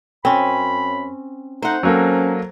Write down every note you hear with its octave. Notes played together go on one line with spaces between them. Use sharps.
F#2 C4 C#4 B5
A3 D#4 C5 F#5
F#3 A#3 C4 C#4 A4